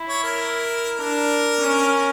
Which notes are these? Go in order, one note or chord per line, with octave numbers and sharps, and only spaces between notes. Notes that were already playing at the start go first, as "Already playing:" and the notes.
Already playing: E4
C#5
A#4
D4 A#4
C#4